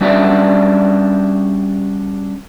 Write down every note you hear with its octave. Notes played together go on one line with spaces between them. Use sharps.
G3 C#4 D4 F#4 D5 E5